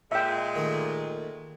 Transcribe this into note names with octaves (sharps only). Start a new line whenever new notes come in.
A#2 G#3 E5 G5
D#3 A3